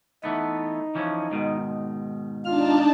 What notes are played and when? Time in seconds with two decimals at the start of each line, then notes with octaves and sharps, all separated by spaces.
0.24 E3 A3 B3 D#4
0.95 E3 F3 C#4
1.31 G#2 B2 D#3
2.45 D4 D#4 F4 A5 F6